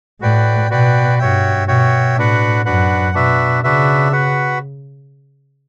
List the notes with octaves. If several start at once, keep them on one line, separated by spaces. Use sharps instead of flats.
A2 F#4 B4 D5 G5
B2 F#4 B4 D5 G5
G2 F#4 C#5 E5 G5
B2 F#4 C#5 E5 G5
A2 D4 F#4 B4 F#5
F#2 D4 F#4 B4 F#5
B2 D4 F#4 B4 E5
C#3 D4 F#4 B4 E5
F#4 B4 F#5